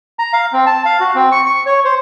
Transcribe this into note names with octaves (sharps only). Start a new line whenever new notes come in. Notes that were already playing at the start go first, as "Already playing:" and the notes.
A#5
F5
C4
A5
F5
F#4
C4
C#6
C#6
C#5
C5